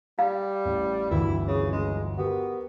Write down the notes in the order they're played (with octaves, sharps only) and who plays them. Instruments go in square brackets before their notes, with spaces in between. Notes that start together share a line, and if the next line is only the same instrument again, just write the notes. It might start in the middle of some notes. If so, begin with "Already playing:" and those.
[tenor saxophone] G3 [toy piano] F5
[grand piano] A1
[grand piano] G1 D2 E3 [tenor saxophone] E4
[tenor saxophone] C#3
G#3
[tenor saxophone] B3 [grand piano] F#4 G4 A#4